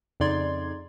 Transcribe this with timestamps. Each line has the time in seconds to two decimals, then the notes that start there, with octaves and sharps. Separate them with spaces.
0.20 F2 C#3 D#4 D5 C6 G#6